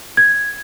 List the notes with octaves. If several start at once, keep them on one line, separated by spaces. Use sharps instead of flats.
G#6